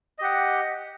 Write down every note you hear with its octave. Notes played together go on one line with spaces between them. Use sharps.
G4 D#5 F#5